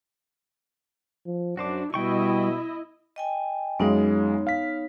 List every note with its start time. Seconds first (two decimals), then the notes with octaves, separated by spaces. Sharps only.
1.26 F3
1.57 F#2 D4 F#4 C5 D6
1.94 B2 G3 E4 D#5 G5 C#6
3.16 D#5 G5 G#5
3.80 F#2 G#3 B3 D#4 C#5 F5
4.47 F5 B6